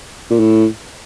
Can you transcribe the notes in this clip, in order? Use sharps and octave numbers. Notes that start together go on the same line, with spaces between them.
A#2
A2